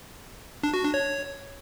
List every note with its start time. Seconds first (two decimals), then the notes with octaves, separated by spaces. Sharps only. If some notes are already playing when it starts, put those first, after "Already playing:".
0.63 D4
0.74 F#4
0.84 D4
0.94 C#5